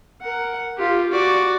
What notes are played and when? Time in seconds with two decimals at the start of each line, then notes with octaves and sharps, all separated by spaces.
0.21 A#4 F#5
0.78 F4 G4
1.11 F#4 D5